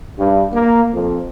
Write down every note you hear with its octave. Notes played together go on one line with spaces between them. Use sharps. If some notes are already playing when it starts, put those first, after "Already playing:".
G2
A#3
F2